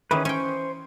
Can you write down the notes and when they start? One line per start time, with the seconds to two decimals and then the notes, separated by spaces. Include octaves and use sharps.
0.11 D#3 E3 C#4 G#4 B4
0.25 C#4 C5 G5 C#6